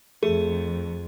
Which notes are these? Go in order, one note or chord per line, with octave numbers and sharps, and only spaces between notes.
F2 A3 G#4